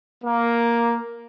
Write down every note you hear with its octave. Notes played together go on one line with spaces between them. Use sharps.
A#3